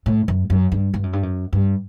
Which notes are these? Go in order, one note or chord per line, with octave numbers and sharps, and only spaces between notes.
A2
F#2
F#2
G2
G2
F#2
G2
F#2
G2